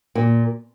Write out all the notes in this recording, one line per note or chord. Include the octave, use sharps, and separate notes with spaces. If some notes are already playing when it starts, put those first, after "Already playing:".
A#2